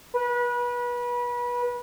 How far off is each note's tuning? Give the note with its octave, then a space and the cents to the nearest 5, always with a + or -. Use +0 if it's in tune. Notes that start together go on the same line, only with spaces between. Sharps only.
B4 -30